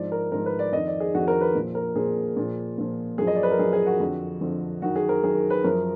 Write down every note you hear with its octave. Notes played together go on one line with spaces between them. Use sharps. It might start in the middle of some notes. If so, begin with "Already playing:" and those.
Already playing: G#2 F3 D5
A#4
G#2 F3 A#4
B4
D5
F2 D#3 D#5
D5
G#4
F2 D#3 F#4
A#4
B4
A#2 F3
A#4
A#2 F3 G#4
A#2 F3
A#2 F3
F#2 F3 G#4
D#5
D5
B4
A#4
F#2 F3 G#4
G#4
F#4
F2 D3 F3
F2 D3 F3
F#2 D#3 F#4
G#4
A#4
F#2 D#3 G#4
B4
F#2 F3 A#4